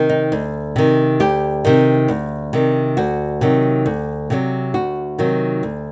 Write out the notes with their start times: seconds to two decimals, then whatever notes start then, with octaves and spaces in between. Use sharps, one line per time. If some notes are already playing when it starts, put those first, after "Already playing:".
Already playing: C3 D#3
0.09 D#4
0.32 D2
0.76 C3 D#3
1.20 D2 G4
1.65 C3 D#3
2.08 D2
2.53 C3 D#3
2.97 D2 F#4
3.41 C3 D#3 F#3
3.86 D2
4.30 C3 D#3 F#3
4.74 D2 F#4
5.18 C3 D#3 F#3
5.63 D2